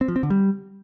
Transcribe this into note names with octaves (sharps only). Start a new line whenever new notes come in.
C4
F3
C4
D3
G3